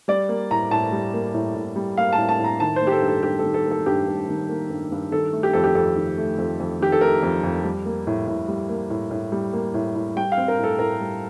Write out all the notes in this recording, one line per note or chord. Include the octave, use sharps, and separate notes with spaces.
G3 D5
A#3
A2 A#5
A2 A5
G3
A#3
A2
A2
G3
A#3 F5
A5
A2
A5
A2
A#5
D#3 A5
C5
A#3
G4
A4
G2
A4
G2 G4
D#3 A4
A4
A#3
A4
G2 G4
G2
D#3
A#3
G2
G2
D#3 A4
A3
G4
F2 A4
G4
F2 A4
D#3
A3
F2
F2
D#3 G4
A4
A3 A#4
F2
F2
G3
A#3
A2
A2
G3
A#3
A2
A2
G3
A#3
A2
A2
G3 G5
F5
C4
A#4
A2
A4
A2 A#4
G3